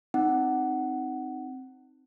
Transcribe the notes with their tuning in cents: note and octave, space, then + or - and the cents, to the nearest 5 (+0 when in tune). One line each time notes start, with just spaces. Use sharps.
C4 +0 D#4 +0 F#5 +15